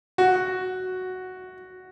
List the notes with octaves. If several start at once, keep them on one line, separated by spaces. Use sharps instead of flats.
F#4